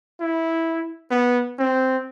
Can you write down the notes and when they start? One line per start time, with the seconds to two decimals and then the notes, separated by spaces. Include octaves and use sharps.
0.21 E4
1.11 B3
1.59 C4